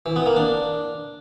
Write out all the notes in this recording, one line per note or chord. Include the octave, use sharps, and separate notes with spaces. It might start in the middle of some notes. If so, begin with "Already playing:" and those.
E3
B3
A#3
D4